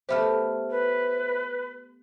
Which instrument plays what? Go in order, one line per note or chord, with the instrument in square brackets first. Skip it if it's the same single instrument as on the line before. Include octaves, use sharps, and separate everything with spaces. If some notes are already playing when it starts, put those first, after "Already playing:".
[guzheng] A3 B3 G4 [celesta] C5 E5 F6
[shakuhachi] B4